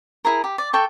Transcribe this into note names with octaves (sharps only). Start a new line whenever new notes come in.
E4 G#4 A#4
G4
D5
A4 G5 C#6